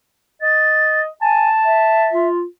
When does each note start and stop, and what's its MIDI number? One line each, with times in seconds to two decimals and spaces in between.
0.42 1.08 75
0.42 1.01 93
1.22 1.49 80
1.22 2.07 81
1.65 2.28 76
2.13 2.44 65